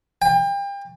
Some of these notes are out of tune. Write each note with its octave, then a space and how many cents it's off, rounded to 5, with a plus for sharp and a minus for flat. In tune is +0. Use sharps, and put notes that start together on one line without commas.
G5 +35